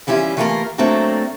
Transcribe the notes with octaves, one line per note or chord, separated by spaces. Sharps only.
E3 G3 C#4 E4 F4
E3 A3 A#3 F4 G4 A#4
F#3 A3 A#3 C4 D4 A#4